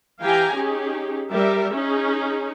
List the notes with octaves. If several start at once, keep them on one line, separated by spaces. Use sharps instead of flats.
E3 G4 F5 G5 G#5 A#5
C#4 D#4 G4 G#4
G3 G4 A#4 E5
C#4 D#4 G#4